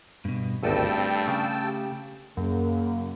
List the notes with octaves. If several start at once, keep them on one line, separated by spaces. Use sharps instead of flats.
G2 B2
G#1 D2 G2 A3 D#4 G5 A5 E6
C4
C#3
G4
F#2 C#3 A#3